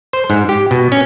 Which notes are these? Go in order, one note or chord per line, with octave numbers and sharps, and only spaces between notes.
C5
G#2
G4
B2
C#4